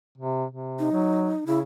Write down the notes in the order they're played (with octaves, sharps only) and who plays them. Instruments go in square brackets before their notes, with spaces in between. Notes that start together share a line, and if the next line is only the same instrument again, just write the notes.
[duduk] C3
C3
[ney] D#4
[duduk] F#3
[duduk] C#3 [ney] E4